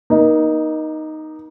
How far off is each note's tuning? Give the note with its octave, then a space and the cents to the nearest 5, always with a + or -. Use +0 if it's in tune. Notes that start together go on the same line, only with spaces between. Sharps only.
A#3 +35 D#4 +0